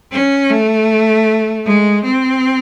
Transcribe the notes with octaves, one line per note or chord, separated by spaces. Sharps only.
C#4
A3
G#3
C4